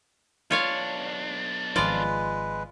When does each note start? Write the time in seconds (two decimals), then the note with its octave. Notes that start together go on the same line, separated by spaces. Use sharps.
0.51 B1 D4 F4 C#5 F5
1.76 G#1 F3 G#3 F4 B4 D5